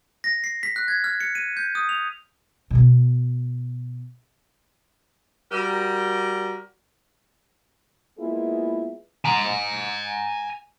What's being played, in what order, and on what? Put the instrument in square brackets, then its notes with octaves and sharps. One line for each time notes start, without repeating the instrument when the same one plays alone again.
[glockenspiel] A#6
C7
B6
F#6
G#6
F6
C#7
D#7
G6
D#6
F7
[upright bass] B2 B3
[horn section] G3 F#4 A#4
[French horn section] G#3 A#3 B3 E4 F4 G#4
[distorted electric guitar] G#5 A#5